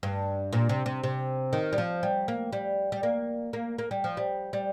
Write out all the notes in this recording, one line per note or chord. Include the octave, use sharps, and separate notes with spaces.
G2
A#2
C3
C3
C3
D#3
G3
F3
G3
A#3
G3
G3
A#3
A#3
A#3
G3
F3
G3
G3